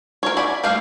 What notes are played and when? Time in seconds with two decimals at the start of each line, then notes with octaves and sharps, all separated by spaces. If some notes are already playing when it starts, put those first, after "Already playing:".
0.23 A#4 C#5
0.37 D5 G#5 B5
0.64 G3 A3 A#3 F5